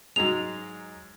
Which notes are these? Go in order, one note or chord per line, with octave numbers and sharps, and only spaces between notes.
G#2 F#3 G#3 F7